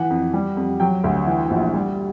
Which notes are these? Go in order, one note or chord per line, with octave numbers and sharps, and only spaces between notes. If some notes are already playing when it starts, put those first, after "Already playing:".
Already playing: E3 F#5
F2
G3
F2
F#3 G5
D2
E3
A#1
G3